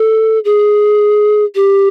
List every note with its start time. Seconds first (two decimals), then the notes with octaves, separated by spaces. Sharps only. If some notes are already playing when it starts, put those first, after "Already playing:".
Already playing: A4
0.45 G#4
1.55 G4